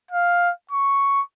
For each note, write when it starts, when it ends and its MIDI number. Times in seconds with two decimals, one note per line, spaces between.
0.11 0.51 77
0.71 1.22 85